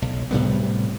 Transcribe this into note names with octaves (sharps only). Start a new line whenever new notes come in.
B1
A2 C3 G3 B3